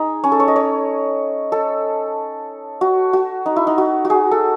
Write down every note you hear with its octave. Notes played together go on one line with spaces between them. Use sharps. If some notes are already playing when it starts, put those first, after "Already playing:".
Already playing: D#4 G#4
C#4
A4
C#5
D#5
C#5
A4
F#4
F#4
D#4
E4
D#4
F#4
F#4
G#4
A4